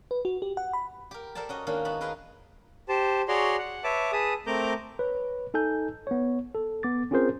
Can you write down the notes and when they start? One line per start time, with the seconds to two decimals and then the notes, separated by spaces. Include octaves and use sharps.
0.11 B4
0.25 F#4
0.42 G4
0.57 F#5
0.73 B5
1.11 G4 A#4
1.35 A4 A#4 C5 D5 A5
1.49 C#4 F#4 D#5
1.67 D#3 G#3 A#3 C#4 D4
1.85 B3 D#4 F#4 A5 B5
2.01 G#4 A#4 B4 D#5 F5 G#5
2.89 G4 C5 A5
3.28 F#4 G#4 C#5 D5 A#5 C6
3.58 F#5
3.84 B4 C#5 E5 A5 D6
4.12 G#4 B4 A5 D#6
4.47 A3 C4 A#4 A#5 D6 G6
4.99 B4 C#5
5.54 D#4 A4 G#5 G6
6.07 B3 C#5
6.55 A4
6.83 B3 D6 A6
7.11 C4 C#4 F4 G#4 A#4 C5